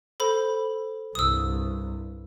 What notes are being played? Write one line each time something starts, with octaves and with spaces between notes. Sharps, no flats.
A4 C5 B5
C2 G2 D#6 E6